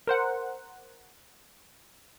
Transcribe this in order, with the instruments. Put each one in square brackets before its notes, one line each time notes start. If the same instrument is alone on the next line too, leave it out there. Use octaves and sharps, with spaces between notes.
[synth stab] A#4 C5 F#5